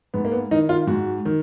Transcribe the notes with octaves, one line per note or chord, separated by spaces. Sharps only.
G#2 B3
A#3
B3
D#3 D#4
F4
G#2 F#4
D#3